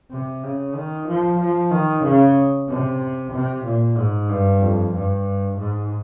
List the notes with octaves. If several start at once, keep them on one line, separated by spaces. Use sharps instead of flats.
C3
C#3
D#3
F3
F3
D#3
C#3
C3
C3
A#2
G#2
G2
F2
G2
G#2